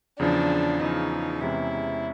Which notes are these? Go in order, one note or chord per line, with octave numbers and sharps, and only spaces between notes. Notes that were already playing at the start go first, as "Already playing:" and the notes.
E2 C#3 F3 D4
E2 C#3 F3 D#4
E2 C3 E3 G#3 C#4 E4